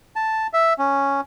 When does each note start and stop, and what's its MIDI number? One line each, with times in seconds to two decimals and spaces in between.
0.16 0.47 81
0.53 0.73 76
0.79 1.21 61